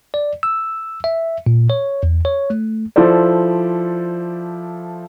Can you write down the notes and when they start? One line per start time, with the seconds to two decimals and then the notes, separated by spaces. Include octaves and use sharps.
0.14 D5
0.43 E6
1.04 E5
1.46 A#2
1.70 C#5
2.03 E2
2.25 C#5
2.50 A3
2.96 F3 E4 A4 C5 D5